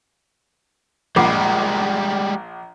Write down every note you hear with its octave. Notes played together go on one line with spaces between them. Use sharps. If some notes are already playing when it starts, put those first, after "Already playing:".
A#1 G3 G#3 F4 F#5 D6